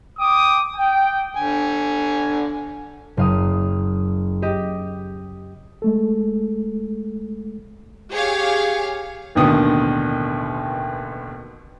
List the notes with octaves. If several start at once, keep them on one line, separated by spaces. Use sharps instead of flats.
G5 D6 D#6
G5
D3 G#5
F#1 F5 D#6
G4 D#5
G#3 A3 A4
G4 G#4 C#5 F5
A1 D#2 B2 D3 D#3 D#6